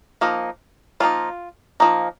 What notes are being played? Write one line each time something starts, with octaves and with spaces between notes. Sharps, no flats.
F3 A#3 D#4
F3 A#3 D#4 F4
F3 A#3 D#4